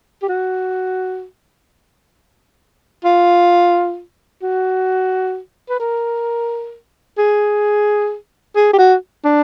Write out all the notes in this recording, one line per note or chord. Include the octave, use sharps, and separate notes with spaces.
G4
F#4
F4
F#4
B4
A#4
G#4
G#4
G4
F#4
D4